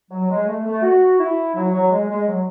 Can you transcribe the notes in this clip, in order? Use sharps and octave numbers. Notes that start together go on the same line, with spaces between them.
F#3
G#3
A3
A3
F#4
E4
F#3
F#3
G#3
G#3
F#3